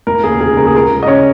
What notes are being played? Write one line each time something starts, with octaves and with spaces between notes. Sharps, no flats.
F1 A#4
D#2 C#3 G#4
F1 G#4
D#2 C#3 A#4
G#4
C#2 A#4
C#3
D#5
C#4 C#5